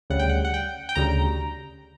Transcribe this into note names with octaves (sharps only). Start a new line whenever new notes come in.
D2 C#3 G3 F#5
G5
F#5
F#5
G5
G5
D2 C#3 G3 A#5